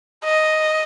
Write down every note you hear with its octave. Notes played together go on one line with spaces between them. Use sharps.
D#5